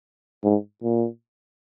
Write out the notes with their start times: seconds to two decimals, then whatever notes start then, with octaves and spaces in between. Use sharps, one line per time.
0.44 G#2
0.83 A#2